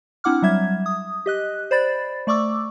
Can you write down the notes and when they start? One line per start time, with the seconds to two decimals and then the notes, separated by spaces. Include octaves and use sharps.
0.24 C4 D4 E4 F#5 D6 F6
0.42 F#3 G3 E5 G#6
0.86 D#6
1.26 G4 D#5 F#6
1.71 C5 D5 B5 A6
2.27 A3 D5 C#6 D6 E6